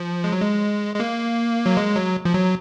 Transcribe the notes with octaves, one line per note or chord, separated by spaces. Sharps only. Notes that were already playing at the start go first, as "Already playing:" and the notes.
Already playing: F3
G#3
F#3
G#3
G#3
A#3
F#3
G#3
F#3
F3
F#3